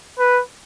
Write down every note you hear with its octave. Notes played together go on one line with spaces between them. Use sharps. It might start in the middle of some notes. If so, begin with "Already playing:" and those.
B4